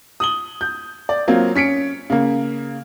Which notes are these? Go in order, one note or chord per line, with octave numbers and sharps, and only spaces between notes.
D#6 F#7 G7
G6
D5
F#3 A#3 C4 F4
C#4 B6 C#7 D7
C#3 A#3